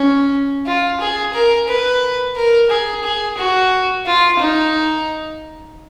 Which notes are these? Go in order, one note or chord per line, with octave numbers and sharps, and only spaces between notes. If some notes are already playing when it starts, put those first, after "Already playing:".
Already playing: C#4
F4
G#4
A#4
B4
A#4
G#4
G#4
F#4
F4
D#4